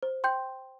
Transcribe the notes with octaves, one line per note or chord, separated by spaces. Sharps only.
C5
G5 C6 G6